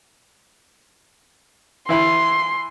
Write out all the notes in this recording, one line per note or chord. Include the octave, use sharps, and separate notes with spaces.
E3 E4 B5 C6